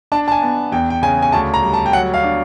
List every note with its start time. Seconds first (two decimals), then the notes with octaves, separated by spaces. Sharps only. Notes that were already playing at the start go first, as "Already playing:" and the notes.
0.12 D4 A5
0.28 A5
0.32 G#5
0.42 B3
0.72 E2 G5
0.90 G5
1.02 C#3 G#5
1.22 G#5
1.32 D2 A5
1.54 A#5
1.63 G3
1.74 A5
1.86 G5
1.93 F#3 F#5
2.14 F5
2.24 D4